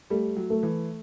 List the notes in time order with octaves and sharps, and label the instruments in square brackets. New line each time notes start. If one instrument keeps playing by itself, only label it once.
[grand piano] G3 [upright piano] A3
[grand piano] F#3
[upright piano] A3
[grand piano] E3